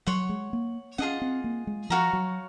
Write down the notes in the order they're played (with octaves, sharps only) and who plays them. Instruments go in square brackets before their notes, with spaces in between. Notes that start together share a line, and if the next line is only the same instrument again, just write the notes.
[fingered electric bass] F#3 [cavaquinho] C#5 F#5 C6
[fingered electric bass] G#3
A#3
[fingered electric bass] C#4 [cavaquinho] F4 G#4 D#5 F#5
[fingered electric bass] C4
A#3
G#3
[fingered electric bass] F3 [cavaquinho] F#4 C#5 F5 A#5
[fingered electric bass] F#3